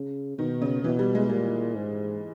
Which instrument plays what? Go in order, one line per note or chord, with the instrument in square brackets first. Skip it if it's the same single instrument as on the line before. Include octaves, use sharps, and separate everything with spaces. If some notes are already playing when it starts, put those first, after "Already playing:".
Already playing: [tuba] C#3
[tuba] B2 [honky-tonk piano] D#3
[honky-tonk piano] C#3
[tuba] B2 [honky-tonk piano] E3
[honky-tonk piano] G3
G#3
[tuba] A#2 [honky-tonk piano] G3
[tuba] G#2